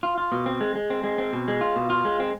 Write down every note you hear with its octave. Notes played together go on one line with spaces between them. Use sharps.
F4
F4
B2
C4
G#3
G#3
C4
G#3
C4
B2
G#3
F4
B2
F4
G#3
C4